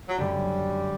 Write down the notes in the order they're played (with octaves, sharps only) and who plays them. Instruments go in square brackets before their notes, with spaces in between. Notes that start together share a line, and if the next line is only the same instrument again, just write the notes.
[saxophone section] F#3
[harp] F#2 D3 A3 D4 G4 [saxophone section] G3